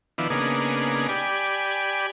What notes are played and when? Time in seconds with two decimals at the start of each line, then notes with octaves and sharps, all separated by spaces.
0.18 D#3 F3 B3 D4 E4
0.30 C#3 A#3 B3 D4 D#4 G#4
1.09 G4 D5 G#5 B5